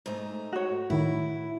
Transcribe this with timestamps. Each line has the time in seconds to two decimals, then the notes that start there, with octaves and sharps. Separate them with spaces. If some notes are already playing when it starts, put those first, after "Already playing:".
0.06 G#2 A3 D#4
0.53 F#4 C#5
0.90 A2 D#3 E4